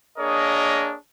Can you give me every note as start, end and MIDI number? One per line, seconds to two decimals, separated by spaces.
0.19 0.94 58
0.19 0.94 62
0.19 0.94 68
0.19 0.94 70
0.19 0.94 73
0.19 0.94 75